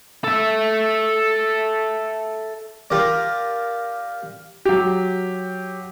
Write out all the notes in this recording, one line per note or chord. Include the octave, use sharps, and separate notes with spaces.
A4 E5
F4 G4 A#4 D5
F#3 G4